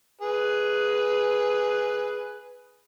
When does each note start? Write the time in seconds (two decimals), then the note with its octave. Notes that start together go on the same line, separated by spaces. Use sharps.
0.21 G#4 B4